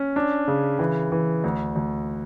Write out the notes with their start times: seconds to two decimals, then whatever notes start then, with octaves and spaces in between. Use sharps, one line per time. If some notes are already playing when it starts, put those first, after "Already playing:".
Already playing: C#4
0.16 D4
0.48 C#3
0.79 E3
1.12 E3
1.44 D2
1.76 D2